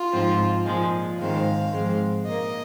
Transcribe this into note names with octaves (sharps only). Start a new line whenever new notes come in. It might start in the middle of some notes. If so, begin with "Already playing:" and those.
Already playing: F4
G#2 F3 C4
A#2 F3 G#3
G#2 D#3 G#3 C4 F5
G#2 F3 G#3 C4
A#2 A#3 D#5